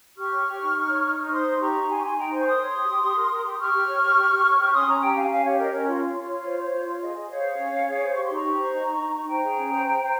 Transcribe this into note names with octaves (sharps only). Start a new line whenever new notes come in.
G4 C#6 F6
C#5
G4
D#4
D#4
C#5
D#4
D#4
C5 C6 D#6
D#4
G4 A#5 C#6
D#4
G4 G#5 C6
C#6
D#4 G#5 C6
D#4 G5 A#5
C5 G#5 C6
C#6
A#4 C6 D#6
C#5
G4
G4
G4
A#4
A#4
G4
G4 C#6 F6
G4
C#5
G4
G4
G4
C#5
G4
C#4 C6 D#6
C#4 A#5 C#6
G4 G5 A#5
C#4 F5 G#5
C#4 F5 G#5
G4 C#5
A#4 D#5
C#4 C#5
F4
F4
F4 C#5
F4
C5
C5
F4
F4
G#4 D#5
G#4
C5 C#5 F5
G#4
C#4
C#4
G#4
C5
G4 C#6
D#4 C6
A#5 C#6
G4
C5
D#4
D#4
D#4
D#4
C5 G5 A#5
G#4
C#4
C5
C5
C5